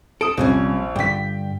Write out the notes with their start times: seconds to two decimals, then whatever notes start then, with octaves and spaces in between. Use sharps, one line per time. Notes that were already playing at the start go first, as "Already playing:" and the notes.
0.21 A4 D#6 D7
0.37 A#1 C3 G3 C#4
0.96 G2 D3 G5 B6